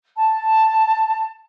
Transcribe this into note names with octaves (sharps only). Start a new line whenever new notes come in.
A5